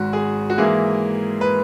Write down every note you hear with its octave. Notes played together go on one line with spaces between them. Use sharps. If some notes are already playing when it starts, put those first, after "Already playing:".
Already playing: G#1 G#2 D#3 F#4
G#4
F#4
G#2 E3 A#3 E4 G#4
B4